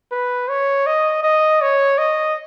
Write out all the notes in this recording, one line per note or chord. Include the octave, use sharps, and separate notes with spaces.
B4
C#5
D#5
D#5
C#5
D#5